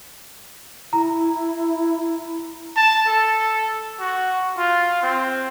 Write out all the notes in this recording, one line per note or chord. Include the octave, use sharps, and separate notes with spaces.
E4 A#5
A5
A4
F#4
F4
C4